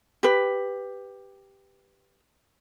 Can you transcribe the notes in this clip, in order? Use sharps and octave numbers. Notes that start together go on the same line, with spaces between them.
G4 B4